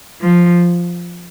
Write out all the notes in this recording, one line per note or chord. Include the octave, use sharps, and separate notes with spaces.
F3